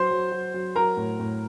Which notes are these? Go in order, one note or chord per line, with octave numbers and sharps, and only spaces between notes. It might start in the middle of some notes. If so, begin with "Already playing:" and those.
Already playing: F#3 C5 C6
F#3
F#3
F#3
F#3 A#4 A#5
A2
A2